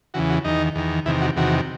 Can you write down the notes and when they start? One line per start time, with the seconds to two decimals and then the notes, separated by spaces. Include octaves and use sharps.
0.14 E2 C#3 E3 F#4
0.30 F#4
0.45 E2 D#3 D#4
0.75 E2 D#3
1.06 E2 C3 D#3 E4
1.21 F#4
1.36 E2 C3 D#3 F#4